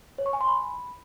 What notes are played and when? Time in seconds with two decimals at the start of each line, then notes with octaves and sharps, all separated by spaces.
0.18 C#5
0.26 C#6
0.33 G#5
0.41 C6
0.48 B5